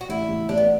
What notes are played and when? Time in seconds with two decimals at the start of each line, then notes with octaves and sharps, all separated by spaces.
0.01 F#4
0.09 A1 E4
0.29 A1
0.49 A1 D4
0.58 B3